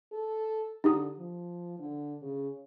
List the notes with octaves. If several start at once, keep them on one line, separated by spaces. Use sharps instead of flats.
A4
D3 D#4 G4 D#6
F3
D3
C#3